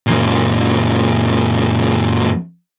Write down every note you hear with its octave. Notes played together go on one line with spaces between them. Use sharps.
F#2 A#2